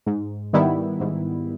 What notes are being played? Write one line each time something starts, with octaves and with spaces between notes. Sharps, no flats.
G#2
D#3 G3 B3 E4
G#2